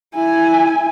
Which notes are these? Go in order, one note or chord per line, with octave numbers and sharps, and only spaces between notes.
E4 G#5